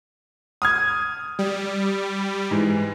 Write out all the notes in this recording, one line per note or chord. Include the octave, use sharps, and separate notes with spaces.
D#6 F6 G#6
G3
G#2 E3